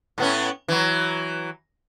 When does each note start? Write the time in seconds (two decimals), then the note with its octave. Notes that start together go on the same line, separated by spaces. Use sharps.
0.18 A2 B3 C#4
0.68 E3 F#3